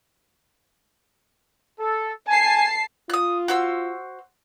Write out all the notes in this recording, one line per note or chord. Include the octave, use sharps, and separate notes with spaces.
A4
G#5 A5 C7
F4 D#6 F#6
F#4 C5 E6